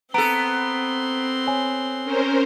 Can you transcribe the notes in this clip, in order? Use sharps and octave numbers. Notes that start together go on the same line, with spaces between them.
B3 C4 A4 A#5 C6 D7
C#5 G#5
C#4 A#4 C5